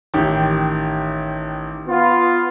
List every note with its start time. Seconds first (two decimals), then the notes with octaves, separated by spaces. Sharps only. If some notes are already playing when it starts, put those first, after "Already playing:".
0.14 A1 D#3 G4
1.88 B3 F4